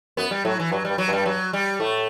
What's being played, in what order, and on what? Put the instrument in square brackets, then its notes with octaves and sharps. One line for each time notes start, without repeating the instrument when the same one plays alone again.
[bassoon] F#2 [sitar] B3
[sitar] G3
[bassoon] A2 [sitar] F#3
[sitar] E3
[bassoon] G2 [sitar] F#3
[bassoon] G2 [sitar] G3
[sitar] F#3
[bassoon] G2 [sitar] G3
[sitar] F#3
G3
[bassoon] A2 [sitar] A3